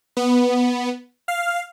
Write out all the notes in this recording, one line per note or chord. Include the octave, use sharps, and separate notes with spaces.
B3
F5